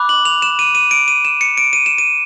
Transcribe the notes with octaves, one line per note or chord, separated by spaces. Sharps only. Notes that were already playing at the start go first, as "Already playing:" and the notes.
Already playing: B5 D6 F#6
F#7
F7
E7
D#7
D#7
D7
D#7
E7
C#7
D7
D#7
E7
D#7